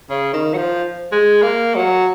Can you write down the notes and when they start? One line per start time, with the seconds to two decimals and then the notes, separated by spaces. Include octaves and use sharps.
0.10 C#3
0.33 D#3
0.53 F#3
0.57 F3
1.12 G#3
1.43 A#3
1.75 F#3